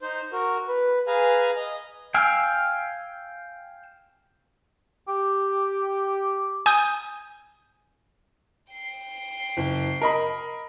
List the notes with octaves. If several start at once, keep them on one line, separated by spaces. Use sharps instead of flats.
D#4 C5
F#4 A#4
B4
G#4 B4 F5 G#5 A#5
D#5
F5 G5 G#5 E6 F6
G4
G#5 D#6 G6
G5 C7
F#1
A#4 D#5 B5